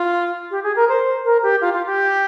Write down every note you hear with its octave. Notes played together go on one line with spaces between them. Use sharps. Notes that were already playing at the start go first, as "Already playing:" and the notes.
Already playing: F4
G4
G#4
A#4
C5
A#4
G4
F4
F4
G4